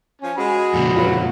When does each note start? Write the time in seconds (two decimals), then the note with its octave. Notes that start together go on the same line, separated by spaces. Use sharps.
0.21 F3 C#4 C#5
0.37 G#3 F#4 G#4 B5
0.74 F2 A#2 C#3
0.97 D#2 G#2 F#3 F4 B4